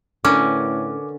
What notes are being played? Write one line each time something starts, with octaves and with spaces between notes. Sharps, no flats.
A2 D3 C#4 A#4 B4 D6